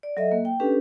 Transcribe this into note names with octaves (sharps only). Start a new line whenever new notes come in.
D5
F#3 A4 D#5 E5
A#3
G5
C#4 D4 G4 A4 B4